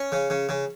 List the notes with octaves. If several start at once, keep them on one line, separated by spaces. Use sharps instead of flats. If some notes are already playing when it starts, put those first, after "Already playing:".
Already playing: C#4
C#3
C#3
C#3